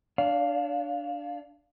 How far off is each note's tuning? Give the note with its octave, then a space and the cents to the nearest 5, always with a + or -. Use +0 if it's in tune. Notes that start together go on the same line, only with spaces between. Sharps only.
D4 +0 D5 -45 F5 +0